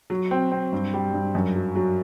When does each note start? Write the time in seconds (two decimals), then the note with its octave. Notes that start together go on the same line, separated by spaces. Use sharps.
0.10 F#3
0.31 C4
0.52 C4
0.72 G2
0.94 G3
1.14 G2
1.35 F#2
1.55 F#3
1.76 F#3